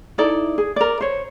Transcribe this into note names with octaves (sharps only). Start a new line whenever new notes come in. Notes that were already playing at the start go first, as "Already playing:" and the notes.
D#4 E4 A4 D5
G#4
A#4 D5
C5 C#5